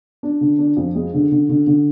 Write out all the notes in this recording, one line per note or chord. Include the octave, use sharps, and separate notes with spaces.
D4
D3
D4
F2
G#3
D3
D3
D3
D3